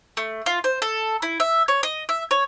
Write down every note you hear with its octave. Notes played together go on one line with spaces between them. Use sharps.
A3
F4
C5
A4
E4
E5
C#5
D#5
E5
C#5